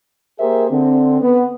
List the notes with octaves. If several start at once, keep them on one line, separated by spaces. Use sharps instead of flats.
A#3 G4 G#4 A#4 C5 E5
D3 C4
B3